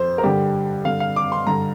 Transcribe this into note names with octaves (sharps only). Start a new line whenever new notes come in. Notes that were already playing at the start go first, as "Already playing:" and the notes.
Already playing: F2 C5
A#4
G2 D3 G4
G2 D3 F5
F5
D6
C6
G2 D3 A#5